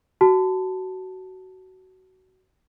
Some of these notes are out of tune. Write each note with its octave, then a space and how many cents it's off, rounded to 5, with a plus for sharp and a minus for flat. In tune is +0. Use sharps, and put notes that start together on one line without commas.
F#4 +20 A5 +0